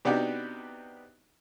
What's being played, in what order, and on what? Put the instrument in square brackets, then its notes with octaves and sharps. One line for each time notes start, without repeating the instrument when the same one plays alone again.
[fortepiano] C3 B3 D4 D#4 F#4 G4